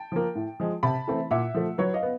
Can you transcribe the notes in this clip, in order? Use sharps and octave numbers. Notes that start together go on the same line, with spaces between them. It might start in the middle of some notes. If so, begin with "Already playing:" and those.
Already playing: G5 A5
F3 A#3
A2
F3 G#3
C3 A5 B5
E3 A3 C4 E4
A#2 E5 F#5
F3 A3
F#3 B4 C#5
D#5 F5
B3